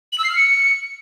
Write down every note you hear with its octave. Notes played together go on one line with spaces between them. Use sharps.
F#7
E6
C7
F6
C#7